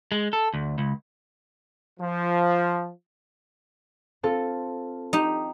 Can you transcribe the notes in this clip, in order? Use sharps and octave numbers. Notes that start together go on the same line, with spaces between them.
G#3
A4
D2
C#2
F3
C4 F4 A4
D#4 G4